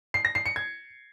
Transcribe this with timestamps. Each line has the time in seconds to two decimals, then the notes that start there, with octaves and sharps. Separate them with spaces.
0.14 C7
0.25 A#6
0.35 C7
0.46 C#7
0.56 G#6